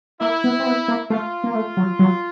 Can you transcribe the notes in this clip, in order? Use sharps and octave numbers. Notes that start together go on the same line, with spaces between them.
A#3 E4
B3
C4
B3
A#3
A3 F4
A#3
A3
F#3
F#3